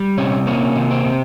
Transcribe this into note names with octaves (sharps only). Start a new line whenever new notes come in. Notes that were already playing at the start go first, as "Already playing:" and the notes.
Already playing: G3
C3 C#4
A#3 C#4
C3
C4
C3